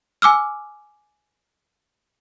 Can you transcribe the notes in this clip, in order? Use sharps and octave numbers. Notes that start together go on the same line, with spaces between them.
G#5 D6 E6 F6